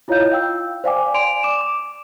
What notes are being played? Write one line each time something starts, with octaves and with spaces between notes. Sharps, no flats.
E4 F4 C#5 D#5 F5 G6
F5 G5 E6
C5 D5 F5 G5 G#5 D6
D5 G#5 C6 D7 F7
D6 E7
D6